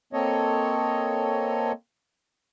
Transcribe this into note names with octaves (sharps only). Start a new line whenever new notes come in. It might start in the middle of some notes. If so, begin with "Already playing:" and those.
A#3 C4 A4 C#5 D#5